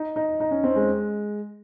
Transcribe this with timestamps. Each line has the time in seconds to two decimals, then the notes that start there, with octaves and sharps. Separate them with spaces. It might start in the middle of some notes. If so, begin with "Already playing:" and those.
Already playing: D#4
0.16 D#4
0.40 D#4
0.51 C#4
0.63 C4
0.75 G#3